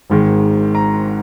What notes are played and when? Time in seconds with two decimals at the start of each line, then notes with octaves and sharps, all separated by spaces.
0.10 G#1 G#2 D#3 G#3
0.75 A#5